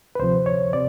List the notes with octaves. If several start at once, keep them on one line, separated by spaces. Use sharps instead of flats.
B4
D2 C3 F3 C5
C#5
C3 D5